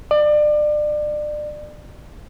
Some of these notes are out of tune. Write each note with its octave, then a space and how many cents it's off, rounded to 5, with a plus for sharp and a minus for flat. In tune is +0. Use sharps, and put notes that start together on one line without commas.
D5 +30